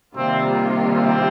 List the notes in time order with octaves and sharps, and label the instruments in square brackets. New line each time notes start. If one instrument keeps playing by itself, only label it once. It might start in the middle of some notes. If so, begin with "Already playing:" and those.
[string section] C3 D#3 G3 A#3 F4 [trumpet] C4
[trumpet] C4